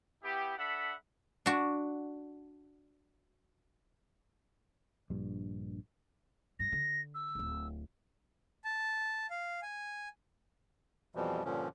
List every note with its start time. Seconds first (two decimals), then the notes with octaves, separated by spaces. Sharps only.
0.24 B3 E4 G4
0.58 D4 A4 E5 F#5 B5
1.46 D4 F#4
5.10 A#1 G2
6.59 G2 A#6
6.72 D3
7.15 E6
7.35 D1 G1
8.65 A5
9.30 F5
9.63 G#5
11.15 F2 B2 E3 F3 G3
11.45 G2 A#2 D3 F3 C#4